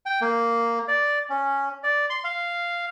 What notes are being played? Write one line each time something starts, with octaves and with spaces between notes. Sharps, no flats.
G5
A#3
D5
C#4
D5
C6
F5